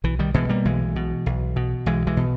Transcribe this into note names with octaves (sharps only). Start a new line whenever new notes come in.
B1 E3
D#3 G3
B2 E3 G#3
G3 A#3
B1 E3 G#3
B2
B1
B2
B1 E3 G#3
E3 G#3
B2